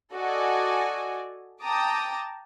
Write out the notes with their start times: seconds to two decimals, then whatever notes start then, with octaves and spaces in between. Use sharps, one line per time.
0.14 F#4 A4 D5 D#5 G#5
1.62 G5 A5 A#5 D6 D#6